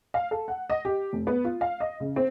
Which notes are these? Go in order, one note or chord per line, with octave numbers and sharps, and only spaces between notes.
F5
A4
F#5
D#5
G4
F1
B3
F4
F5
D#5
C#3
C4